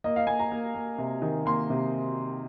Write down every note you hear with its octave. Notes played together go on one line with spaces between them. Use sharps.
A#3 D#5
F5
A#3 G#5
A#5
A#3
A#3
C3
D#3
A#3 C6
C3